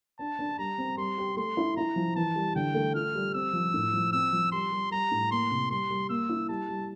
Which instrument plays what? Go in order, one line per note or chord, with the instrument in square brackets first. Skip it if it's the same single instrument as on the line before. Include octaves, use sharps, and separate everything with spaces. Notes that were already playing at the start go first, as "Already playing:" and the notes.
[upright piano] D4 [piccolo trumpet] A5
[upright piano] D4
[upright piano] G3 [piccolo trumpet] A#5
[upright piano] C4
[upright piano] G3 [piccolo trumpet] C6
[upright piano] G4
[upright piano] A3 [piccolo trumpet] C6
[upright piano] E4
[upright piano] E4 [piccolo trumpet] A#5
[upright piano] F3
[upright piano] E3 [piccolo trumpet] A5
[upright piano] G3
[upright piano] D3 [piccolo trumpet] G5
[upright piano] A3
[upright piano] F4 [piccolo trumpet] F6
[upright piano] G3
[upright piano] C4 [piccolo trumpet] E6
[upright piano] F3
A2
F3
[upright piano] C4 [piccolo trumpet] E6
[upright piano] F3
[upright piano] G3 [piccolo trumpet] C6
[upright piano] G3
[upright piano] G3 [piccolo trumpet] A#5
[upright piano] A2
[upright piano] A#3 [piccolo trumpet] C6
[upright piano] C3
[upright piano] G3 [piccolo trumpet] C6
[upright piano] G3
[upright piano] A#3 [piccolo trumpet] E6
[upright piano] E4
[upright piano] G3 [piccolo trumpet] A5
[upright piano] G3